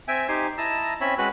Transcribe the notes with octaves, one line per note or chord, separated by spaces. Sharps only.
C4 E5 G5 G#5
D#4 G4 C5 G#5 C6
E4 D#5 A5 A#5 E6
C4 C#4 C#5 E5 B5
G#3 C#4 F#4 B4 B5 F#6